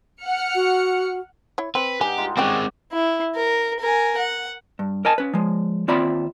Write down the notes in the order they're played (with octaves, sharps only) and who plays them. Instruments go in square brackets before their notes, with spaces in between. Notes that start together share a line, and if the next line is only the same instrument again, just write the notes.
[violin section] F#5 F6 C#7
[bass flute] F#4
[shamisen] E4 C#5
[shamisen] C4 [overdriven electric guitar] B4
[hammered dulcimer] G2 D#4 F#5 [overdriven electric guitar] G4 [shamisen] G#5
[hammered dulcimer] G#3 D#4 F4
[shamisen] G3 C#4 G5 [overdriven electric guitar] G#3 C4 [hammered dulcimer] F#4 D5
[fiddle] E4
A#4
A#4 G#5
F#5
[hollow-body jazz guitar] G2
A#4 D#5 G#5 A5
C#4 B4
F3 G#3
D#2 C4 F4 D5 E5 B5